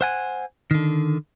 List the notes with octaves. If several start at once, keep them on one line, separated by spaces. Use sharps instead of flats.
C5 F#5 G#5
D3 D#3